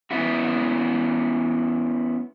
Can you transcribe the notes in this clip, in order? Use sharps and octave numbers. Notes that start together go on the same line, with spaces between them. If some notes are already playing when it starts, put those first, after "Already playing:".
B3 C#4 E4 F#4